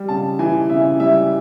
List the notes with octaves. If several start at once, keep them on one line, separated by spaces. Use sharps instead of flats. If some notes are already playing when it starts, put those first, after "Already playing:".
Already playing: G3
C#3 A5
E3 G#5
C#3 E5
G3 E5